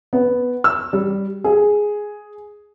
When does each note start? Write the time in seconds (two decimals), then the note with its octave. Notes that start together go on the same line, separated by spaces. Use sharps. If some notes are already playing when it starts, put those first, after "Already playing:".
0.13 B3
0.64 E6
0.93 G3
1.44 G#4